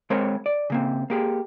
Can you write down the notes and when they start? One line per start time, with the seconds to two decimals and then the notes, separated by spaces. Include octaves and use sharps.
0.10 G#3 C4 A#4 C5 C#5
0.46 D5
0.70 C#3 A#3 C4
1.10 A#3 G4 G#4